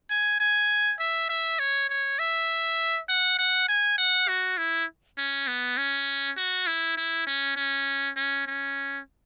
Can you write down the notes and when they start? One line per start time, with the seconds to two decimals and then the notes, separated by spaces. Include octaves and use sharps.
0.10 G#5
0.40 G#5
1.00 E5
1.30 E5
1.59 C#5
1.89 C#5
2.19 E5
3.09 F#5
3.39 F#5
3.69 G#5
3.98 F#5
4.28 F#4
4.58 E4
5.18 C#4
5.48 B3
5.78 C#4
6.37 F#4
6.67 E4
6.97 E4
7.27 C#4
7.57 C#4
8.17 C#4
8.47 C#4